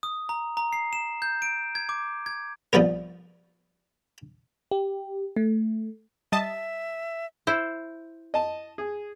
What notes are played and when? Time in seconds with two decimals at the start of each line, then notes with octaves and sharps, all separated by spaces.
0.03 D#6
0.29 A#5
0.57 A#5
0.73 C7
0.93 E7
1.22 G6
1.42 D7
1.75 G#6
1.89 D6
2.26 G#6
2.73 C2 F3 G3 B3 A#4
4.71 G4
5.36 A3
6.32 G3 D#5 E5 A5
7.47 E4 C5
8.34 D#5 A5
8.78 G#4